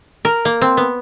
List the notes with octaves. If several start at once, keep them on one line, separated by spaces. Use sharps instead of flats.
A#4
A#3
C4
B3